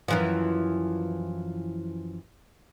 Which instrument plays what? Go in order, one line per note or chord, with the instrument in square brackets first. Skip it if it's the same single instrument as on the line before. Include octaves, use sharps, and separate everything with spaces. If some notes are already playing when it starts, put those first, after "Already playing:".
[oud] F#2 E3 F3